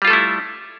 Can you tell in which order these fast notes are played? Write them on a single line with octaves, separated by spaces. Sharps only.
G3 F4 A4 A3 E4